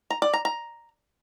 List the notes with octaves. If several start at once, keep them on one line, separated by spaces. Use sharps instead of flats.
A#5
D5
A#5
A#5